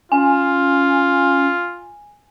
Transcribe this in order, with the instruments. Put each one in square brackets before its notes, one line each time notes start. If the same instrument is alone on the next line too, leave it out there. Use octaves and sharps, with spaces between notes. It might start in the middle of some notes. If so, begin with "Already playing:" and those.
[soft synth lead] C#4 [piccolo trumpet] F4 [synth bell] G#5